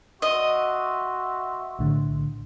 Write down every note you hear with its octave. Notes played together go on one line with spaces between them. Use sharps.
F#4 D#5 E5 C6
B1 A2 D3